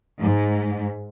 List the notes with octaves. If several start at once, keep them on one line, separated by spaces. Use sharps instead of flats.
G#2